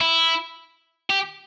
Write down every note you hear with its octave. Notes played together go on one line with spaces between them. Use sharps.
E4
G4